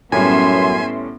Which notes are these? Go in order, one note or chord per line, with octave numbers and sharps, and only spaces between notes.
F#2 A2 G3 B3 C#4 E5 G#5 C6